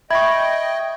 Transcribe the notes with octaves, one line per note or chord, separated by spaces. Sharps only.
D#5 E5 G5 B5 C#6 G#6